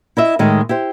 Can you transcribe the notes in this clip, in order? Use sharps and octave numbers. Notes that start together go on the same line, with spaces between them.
E4 D#5 E5
A2 D#3 G#3 A3
E4 G4 C5